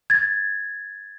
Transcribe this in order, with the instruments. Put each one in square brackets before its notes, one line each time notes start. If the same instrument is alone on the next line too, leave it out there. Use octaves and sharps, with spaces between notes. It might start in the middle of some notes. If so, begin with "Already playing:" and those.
[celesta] G#6 A6